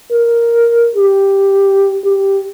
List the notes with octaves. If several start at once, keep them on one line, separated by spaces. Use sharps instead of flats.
A#4
G4
G4